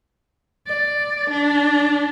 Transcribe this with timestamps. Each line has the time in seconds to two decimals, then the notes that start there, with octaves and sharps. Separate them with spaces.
0.67 D5
1.30 D4